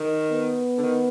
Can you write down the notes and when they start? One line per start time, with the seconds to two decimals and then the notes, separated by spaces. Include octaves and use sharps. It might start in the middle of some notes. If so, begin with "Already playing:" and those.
Already playing: D#3
0.31 B3
0.78 D3
0.83 D#3